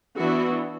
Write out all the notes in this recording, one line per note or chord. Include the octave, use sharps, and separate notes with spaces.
E3 B3 D4 F#4